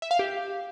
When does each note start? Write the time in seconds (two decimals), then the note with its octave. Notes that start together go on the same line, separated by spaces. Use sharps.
0.02 E5
0.11 F5
0.19 G4